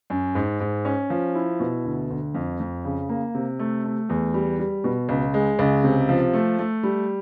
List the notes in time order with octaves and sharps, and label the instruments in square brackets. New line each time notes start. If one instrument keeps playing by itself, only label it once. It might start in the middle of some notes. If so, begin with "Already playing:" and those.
[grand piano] F#2
G#2
G#2
C#4
F3
E4
B2
D2
D2
F2
F2
C#3
A#3
C3
A3
A3
E2
G3
G3
B2
C#2
G#3
C#2
C3
F3
A3
A3
G3